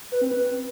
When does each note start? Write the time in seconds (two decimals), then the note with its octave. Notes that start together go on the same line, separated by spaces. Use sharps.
0.12 B4
0.22 C4
0.31 B4